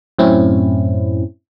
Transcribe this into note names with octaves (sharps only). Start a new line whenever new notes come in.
F#2 A2 C4 C#4 E4